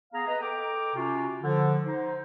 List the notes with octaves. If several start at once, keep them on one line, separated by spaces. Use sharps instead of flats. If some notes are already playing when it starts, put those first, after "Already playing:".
B3 G#4 F5 A#5
B4 D#5 A#5
A4 G5 A#5 D6
C3 C#4 F4 F#4
D3 F3
D#4 C5